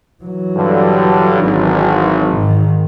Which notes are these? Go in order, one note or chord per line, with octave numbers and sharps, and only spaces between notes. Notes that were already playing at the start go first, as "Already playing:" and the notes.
E3 F#3
G2 D3
G#1
G#2 D#3